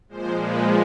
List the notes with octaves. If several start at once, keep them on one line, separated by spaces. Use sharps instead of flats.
A#2 F3 G#3 C5
B4